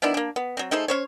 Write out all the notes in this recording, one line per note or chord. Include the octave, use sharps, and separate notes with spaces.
D#3 B3 D4 E4
A#3 D4
B3
F#3 C4
A3 D#4 G#4 C5
C#4 C5 C#5